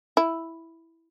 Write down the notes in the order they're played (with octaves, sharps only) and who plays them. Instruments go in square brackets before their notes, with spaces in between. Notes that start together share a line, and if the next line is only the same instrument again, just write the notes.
[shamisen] E4